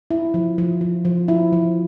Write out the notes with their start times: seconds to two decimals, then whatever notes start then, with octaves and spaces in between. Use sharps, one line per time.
0.10 E4
0.34 F3
0.58 F3
0.81 F3
1.05 F3
1.28 E4
1.53 F3